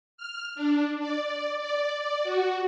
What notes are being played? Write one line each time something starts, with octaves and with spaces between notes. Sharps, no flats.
F6
D4
D5
D5
F#4